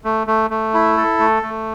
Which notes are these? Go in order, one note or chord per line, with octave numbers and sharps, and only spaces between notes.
A3
A3
A3
E4
A4
A3
A3